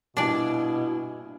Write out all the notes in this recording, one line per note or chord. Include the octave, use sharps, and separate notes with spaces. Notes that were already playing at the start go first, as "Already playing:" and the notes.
A#1 G2 B2 D4 E4 D5 G#5